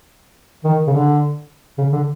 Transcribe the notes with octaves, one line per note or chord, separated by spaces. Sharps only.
D#3
C#3
D3
C#3
D3